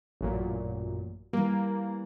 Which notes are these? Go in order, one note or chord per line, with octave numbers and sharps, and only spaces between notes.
A1 F#2 A#2
E3 G3 A#3